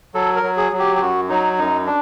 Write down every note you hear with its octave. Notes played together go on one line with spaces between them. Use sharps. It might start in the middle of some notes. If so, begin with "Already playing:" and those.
F#3 A4
A#4
F#3
G#4
F#3
G4
G4
F#2 F#4
F#3 D#4
F#2 D#4
D4